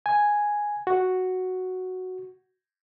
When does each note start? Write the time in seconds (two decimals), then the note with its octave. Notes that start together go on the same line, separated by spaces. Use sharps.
0.06 G#5
0.87 F#4